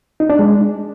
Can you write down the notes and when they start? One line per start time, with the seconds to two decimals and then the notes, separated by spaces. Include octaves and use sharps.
0.20 D#4
0.30 D4
0.39 G#3